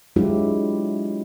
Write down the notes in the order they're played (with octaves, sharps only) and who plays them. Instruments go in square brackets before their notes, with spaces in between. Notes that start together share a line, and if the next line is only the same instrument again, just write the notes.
[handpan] F#3 G#3 D4 E4 F4 G4